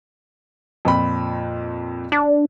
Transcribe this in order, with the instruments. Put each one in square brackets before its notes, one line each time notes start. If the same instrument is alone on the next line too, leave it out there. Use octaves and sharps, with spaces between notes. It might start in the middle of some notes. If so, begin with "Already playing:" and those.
[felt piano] F2 A#2 B5
[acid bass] D4